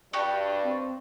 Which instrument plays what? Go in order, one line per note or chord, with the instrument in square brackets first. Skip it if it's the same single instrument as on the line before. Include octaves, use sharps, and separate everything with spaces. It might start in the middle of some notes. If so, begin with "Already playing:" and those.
[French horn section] G2 [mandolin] F#4 G4 [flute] D5
[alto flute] C4